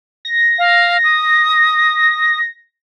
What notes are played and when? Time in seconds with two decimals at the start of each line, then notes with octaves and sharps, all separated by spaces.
0.25 A#6
0.58 F5
1.04 D#6